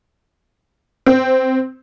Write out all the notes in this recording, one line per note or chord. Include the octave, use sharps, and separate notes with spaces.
C4